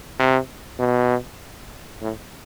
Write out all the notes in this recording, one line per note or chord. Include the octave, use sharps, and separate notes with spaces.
C3
B2
A2